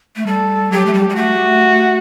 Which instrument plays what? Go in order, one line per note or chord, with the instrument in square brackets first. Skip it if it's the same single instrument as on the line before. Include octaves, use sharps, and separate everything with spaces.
[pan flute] A3
[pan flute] G3 [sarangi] A4
[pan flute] F#3 [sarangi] G4
[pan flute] A3
G3
G3
[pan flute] A3 [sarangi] F#4